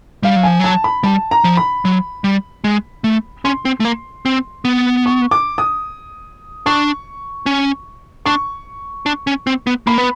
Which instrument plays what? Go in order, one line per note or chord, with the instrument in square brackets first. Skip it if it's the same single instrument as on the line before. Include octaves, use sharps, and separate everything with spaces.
[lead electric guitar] G3 [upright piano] F5
[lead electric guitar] F#3
[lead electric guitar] F3 [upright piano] G#5
[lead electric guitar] F#3 [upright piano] A5
[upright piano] B5
[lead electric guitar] G3 [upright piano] A5
[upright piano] A#5
[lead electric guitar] F3
[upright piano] B5
[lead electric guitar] F#3
G3
G#3
A3
[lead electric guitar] C#4 [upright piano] C6
[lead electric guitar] C4
A3
A#3
C4
B3
[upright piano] C#6
D6
D#6
[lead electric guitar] D4 [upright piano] C#6
[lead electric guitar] C#4
[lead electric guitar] D4 [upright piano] C#6
[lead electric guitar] D4
C#4
C4
B3
[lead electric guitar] A#3 [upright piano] B5
[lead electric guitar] B3